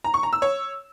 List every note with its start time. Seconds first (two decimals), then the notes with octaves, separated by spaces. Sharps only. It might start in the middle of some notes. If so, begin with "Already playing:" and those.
0.04 A#5
0.14 C#6
0.23 A#5
0.33 E6
0.42 C#5